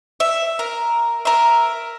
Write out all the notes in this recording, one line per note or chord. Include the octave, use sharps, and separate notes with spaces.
E5
A#4
A#4 E5